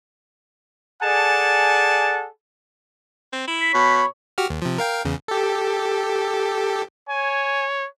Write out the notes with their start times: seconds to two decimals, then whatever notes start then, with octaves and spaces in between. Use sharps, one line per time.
1.02 G#4 A4 D5 F#5 G#5 A5
3.33 C4
3.47 E4
3.61 B6
3.74 B2 C#5 B5
4.38 F#4 G4 F6
4.50 D#2
4.62 C3 F3
4.78 A#4 F5 G5
5.05 E2 C#3
5.28 G4 A4
7.09 C#5 G#5